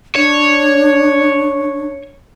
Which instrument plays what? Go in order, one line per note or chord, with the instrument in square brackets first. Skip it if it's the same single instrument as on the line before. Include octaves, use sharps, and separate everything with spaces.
[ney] D4 [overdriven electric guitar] C#5